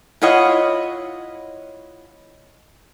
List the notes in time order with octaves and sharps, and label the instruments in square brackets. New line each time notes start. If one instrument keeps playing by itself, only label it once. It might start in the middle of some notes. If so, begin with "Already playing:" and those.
[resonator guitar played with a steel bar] E4 F4 C#5 D#5 F#5